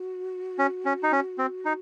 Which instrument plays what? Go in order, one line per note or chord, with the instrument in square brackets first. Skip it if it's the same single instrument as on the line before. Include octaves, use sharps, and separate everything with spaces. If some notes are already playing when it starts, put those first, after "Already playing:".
Already playing: [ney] F#4
[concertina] C#4
C#4
D#4
C#4
C4
D#4